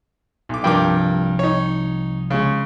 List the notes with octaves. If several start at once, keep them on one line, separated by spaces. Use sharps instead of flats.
B1 D6
C2 G2 F3 A#4 G5 D6
D#4 C#5
C#3 G#3